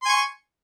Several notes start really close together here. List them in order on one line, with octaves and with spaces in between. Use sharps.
C6 G#5 C#6